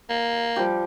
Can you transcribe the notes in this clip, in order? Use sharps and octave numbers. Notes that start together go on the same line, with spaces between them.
A#3
F3 G3 G4